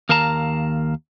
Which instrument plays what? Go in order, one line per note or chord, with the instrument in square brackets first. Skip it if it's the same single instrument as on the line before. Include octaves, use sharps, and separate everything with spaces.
[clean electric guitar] D#2 A#4 F5 A5 A#5